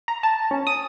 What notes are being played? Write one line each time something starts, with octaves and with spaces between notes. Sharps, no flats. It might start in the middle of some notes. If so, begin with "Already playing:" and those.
A#5
A5
C#4
D#6